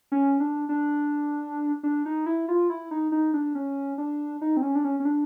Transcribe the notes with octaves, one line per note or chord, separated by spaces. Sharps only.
C#4
D4
D4
D4
D#4
E4
F4
E4
D#4
D#4
D4
C#4
D4
D#4
C4
C#4
D4
C#4
C#4
D4